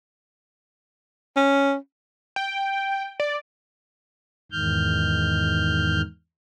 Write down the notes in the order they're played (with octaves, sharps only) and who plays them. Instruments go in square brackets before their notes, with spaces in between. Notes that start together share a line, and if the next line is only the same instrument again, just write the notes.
[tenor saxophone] C#4
[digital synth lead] G5
D5
[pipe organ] E2 G#2 D#3 F6 G6